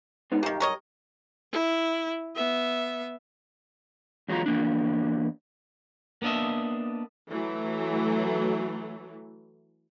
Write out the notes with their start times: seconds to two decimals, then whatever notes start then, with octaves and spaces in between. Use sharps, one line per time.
0.32 G#3 B3 D#4
0.43 B1 G2 D#3 A#3 G4
0.60 A#4 C#5 D#5
1.52 E4
2.35 B3 E5
4.28 E2 F#3 G#3 F4 A#5
4.46 E2 A#3 D4
6.22 A#3 B3 D4 D#5 E5
7.28 E3 F#3 A3